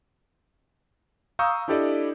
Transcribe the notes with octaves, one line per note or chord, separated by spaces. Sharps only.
F5 A#5 C#6 D#6 E6 G6
D4 E4 G4 A4 D5 D#5